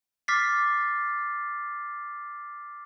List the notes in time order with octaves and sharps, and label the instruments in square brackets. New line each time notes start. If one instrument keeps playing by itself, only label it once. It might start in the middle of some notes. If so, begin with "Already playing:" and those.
[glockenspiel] D6 F6 A6 B6 C7